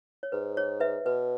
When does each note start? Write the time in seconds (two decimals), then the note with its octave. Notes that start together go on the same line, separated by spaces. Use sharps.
0.23 C#5
0.32 G#2 B4
0.57 G#4 C#5
0.80 B4 E5
1.06 B2 B4